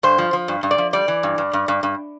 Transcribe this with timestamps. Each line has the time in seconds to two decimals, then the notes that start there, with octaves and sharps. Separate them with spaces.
0.03 G2 C5
0.18 F3
0.33 F3
0.48 G2
0.63 G2
0.71 D5
0.78 F3
0.93 G3 D5
1.08 E3
1.23 G2
1.38 G2
1.53 G2
1.68 G2
1.83 G2